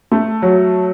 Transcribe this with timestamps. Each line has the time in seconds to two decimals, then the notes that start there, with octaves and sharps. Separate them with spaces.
0.11 A3
0.42 F#3